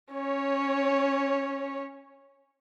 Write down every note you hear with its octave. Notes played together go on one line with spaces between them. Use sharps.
C#4 C#5